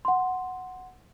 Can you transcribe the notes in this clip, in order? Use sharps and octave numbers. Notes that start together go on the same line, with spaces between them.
F#5 C6